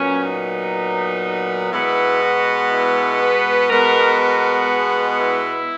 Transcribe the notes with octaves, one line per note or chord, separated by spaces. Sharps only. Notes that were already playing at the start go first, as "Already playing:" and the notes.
Already playing: A#2 F#3 B3 C#4
D#4
B2 G#3 B3 E4
F#4
E4
B4
B2 G#3 B3 A#4
A#4
G#4
E4